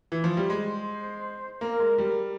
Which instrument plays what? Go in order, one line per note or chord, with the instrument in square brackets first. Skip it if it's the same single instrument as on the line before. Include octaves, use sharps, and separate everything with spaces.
[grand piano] E3
F3
G3
[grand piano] G#3 [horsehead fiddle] C5
[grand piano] A#3 [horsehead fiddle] A#4
[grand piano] G#3
G3